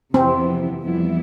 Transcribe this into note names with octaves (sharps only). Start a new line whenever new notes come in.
F2 C3 E3 B3 C4 E4
F2 E3 G3 B3 E4